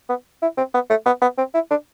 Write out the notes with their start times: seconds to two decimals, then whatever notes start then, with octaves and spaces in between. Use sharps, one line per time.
0.09 B3
0.42 E4
0.58 C4
0.74 B3
0.90 A3
1.06 B3
1.22 B3
1.38 C4
1.54 E4
1.70 D4